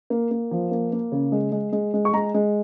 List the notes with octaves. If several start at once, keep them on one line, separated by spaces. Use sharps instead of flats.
A#3
A#3
F3
A#3
A#3
C#3
G#3
G#3
G#3
G#3
C#6
G#3 A#5
G#3